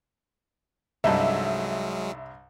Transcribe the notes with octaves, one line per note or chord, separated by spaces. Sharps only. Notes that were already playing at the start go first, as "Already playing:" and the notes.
C2 G2 F#3 G#3 D#4 A4 E5